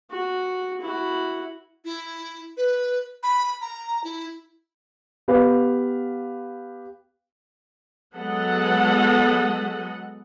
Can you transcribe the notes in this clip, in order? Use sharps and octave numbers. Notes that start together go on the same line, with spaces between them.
F#4
E4 F#4
E4
B4
B5
A#5
E4
B3 G4 B4 F5
F#3 G#3 B3 A4 D#5 F#5